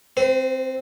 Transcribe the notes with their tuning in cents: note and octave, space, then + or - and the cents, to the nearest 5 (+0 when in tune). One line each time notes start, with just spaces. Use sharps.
C4 +0 C5 -45